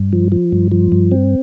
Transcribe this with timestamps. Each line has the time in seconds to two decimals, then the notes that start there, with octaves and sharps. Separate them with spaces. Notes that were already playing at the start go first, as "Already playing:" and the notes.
Already playing: G2
0.13 F3
0.32 F3
0.52 G2
0.71 F3
0.92 G2
1.11 C4